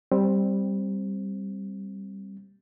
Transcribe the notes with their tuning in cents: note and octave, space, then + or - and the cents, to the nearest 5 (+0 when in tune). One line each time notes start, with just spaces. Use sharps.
G3 +0 C4 +10